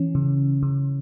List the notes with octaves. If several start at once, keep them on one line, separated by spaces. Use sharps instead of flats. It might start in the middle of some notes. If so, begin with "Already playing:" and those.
Already playing: E3 C#4
C#3
C#3